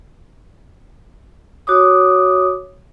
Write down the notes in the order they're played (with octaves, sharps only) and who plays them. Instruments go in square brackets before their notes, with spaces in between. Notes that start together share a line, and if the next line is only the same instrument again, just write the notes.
[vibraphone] F#4 C#5 D6 D#6